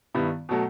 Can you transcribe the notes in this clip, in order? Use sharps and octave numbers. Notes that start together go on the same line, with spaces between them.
G2 D#3 G3 B3 E4
B2 F#3 A3